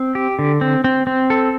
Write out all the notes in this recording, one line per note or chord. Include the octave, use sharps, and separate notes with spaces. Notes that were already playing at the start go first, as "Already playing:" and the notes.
Already playing: C4
G4
D3
C4
C4
C4
A4